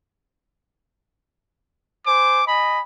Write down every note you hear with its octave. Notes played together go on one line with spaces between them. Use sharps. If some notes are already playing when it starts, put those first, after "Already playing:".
C5 G#5 D6
D#5 G#5 B5